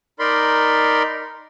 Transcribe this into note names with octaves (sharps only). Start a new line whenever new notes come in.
D#4 A#4 D5 B5 C6